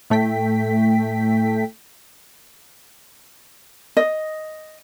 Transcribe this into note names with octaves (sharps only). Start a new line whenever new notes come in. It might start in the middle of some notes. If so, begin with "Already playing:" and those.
A2 A3 G5 B6
D#5